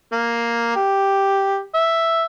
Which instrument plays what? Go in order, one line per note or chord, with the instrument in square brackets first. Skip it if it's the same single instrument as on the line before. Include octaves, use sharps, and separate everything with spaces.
[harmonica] A#3
G4
E5